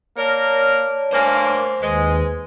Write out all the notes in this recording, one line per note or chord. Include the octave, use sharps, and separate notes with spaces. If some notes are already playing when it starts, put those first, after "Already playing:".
A#3 A#4 C#5 D5 A5
G2 A#3 C5 G#5
D#2 G#3 B4